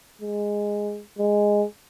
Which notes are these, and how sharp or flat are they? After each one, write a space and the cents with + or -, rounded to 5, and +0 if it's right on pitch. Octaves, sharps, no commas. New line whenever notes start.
G#3 -5
G#3 -5